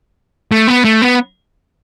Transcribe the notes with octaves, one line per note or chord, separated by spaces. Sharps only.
A3
B3
A3
B3